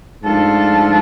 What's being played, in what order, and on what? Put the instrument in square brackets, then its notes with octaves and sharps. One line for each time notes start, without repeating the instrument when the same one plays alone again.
[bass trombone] G#2 [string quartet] F3 A3 D4 F4 A4